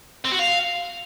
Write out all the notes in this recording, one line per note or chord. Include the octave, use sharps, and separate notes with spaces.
C4
F#4
F5